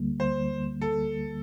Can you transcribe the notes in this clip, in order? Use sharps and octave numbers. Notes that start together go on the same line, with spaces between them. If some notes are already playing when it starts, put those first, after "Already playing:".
Already playing: D2 D3 G3 A#3
C5
A4